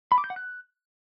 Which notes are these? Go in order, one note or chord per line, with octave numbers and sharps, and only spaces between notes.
B5
D6
G6
F#5
F#6